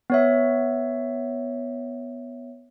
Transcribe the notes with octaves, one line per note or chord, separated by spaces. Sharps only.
B3 C#5 E5